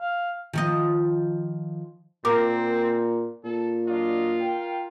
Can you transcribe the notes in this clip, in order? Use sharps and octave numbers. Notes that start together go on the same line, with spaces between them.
F5
D#3 F3 D#5
A#2 C4 A#4 D6
A#2 A4
F#3 D4 F4 D#5
A#4 G5